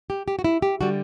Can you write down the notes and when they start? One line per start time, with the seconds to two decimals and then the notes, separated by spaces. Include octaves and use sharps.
0.10 G4
0.28 G4
0.39 F#4
0.45 E4
0.62 G4
0.80 D3 G3 F#4